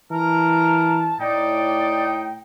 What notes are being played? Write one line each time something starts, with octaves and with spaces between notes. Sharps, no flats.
E3 A#4 A5 A#5
A2 D#4 D5 G5